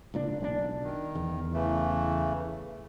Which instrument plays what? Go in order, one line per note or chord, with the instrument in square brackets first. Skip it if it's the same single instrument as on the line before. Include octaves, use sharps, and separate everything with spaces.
[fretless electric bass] C#2 A#2 D4
B1 G3 D4
[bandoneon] D#3
[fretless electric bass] E2
[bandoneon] C#3 E3 A3